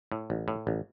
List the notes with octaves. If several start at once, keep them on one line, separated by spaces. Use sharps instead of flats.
A2
A1
A2
A1